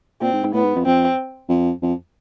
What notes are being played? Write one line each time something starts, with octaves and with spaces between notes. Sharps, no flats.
A#2 C4
G#2
G#2
A2 B3
G#2
F2
F2 C4
F2
F2